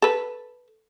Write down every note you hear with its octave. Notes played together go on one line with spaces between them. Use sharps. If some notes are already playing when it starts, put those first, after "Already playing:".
A4 B4